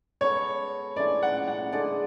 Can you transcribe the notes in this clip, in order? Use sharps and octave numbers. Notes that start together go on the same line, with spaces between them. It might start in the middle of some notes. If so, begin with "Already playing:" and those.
G#3 B3 F#4 A4 C#5
A2 E3 G#3 D4 D5
F#5
F#5
D3 G#3 D4 G#4 D5